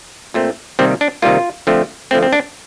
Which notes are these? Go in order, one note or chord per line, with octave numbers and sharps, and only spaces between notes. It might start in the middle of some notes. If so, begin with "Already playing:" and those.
A#2 A3 C4
C3 D#3 G3 A#3 C4
D4
C3 D#3 G3 A#3 F4
D3 F3 A3 C4
D3 F3 A3 C4
C4
D4